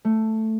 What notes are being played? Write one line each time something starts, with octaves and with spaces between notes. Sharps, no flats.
A3